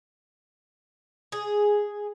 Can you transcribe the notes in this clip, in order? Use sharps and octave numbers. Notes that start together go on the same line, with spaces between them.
G#4